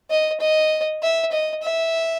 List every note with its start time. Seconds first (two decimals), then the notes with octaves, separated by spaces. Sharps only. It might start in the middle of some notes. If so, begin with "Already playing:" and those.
0.10 D#5
0.40 D#5
1.03 E5
1.32 D#5
1.63 E5